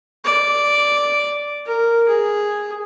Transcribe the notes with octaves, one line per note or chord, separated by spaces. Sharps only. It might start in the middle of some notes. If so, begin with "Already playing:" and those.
D5
A#4
G#4